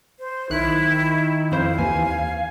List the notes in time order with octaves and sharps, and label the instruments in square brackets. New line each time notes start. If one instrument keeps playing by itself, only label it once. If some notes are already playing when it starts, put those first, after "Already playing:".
[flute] C5
[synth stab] B1 F#6 [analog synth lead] D#3 [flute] E4
[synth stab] F2 E4 C5 [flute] F5
[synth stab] D#2 E3 [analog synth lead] G#5